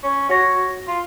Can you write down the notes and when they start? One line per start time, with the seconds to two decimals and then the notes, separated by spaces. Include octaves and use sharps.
0.03 C#4
0.30 F#4 C#5 A#6
0.88 F4